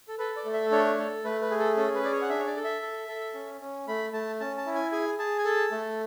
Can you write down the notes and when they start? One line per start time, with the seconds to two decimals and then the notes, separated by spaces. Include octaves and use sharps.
0.08 A4
0.18 A4 B4
0.37 D5
0.45 A3
0.54 E5
0.71 D4 C#5
0.98 A4
1.24 A3 B4
1.42 B4
1.51 G#4
1.59 A4
1.77 C#4 A4
1.95 B4
2.03 G#4 D5
2.12 C#5
2.22 F#5
2.29 D4 E5
2.39 C#5
2.47 D5
2.56 A4
2.64 E5
2.82 A4
3.08 A4
3.34 C#4
3.61 C#4
3.88 A3 B5
4.13 A3 A5
4.40 C#4 A5
4.57 A5
4.66 E4
4.75 G#5
4.92 G#4 G#5
5.18 G#4 A5
5.38 G#5
5.45 A4 A5
5.72 A3